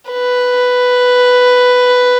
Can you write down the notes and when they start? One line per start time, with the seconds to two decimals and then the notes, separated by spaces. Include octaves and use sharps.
0.11 B4